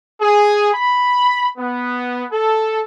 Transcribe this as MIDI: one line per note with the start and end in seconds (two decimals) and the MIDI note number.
0.21 0.71 68
0.74 1.49 83
1.58 2.24 59
2.32 2.81 69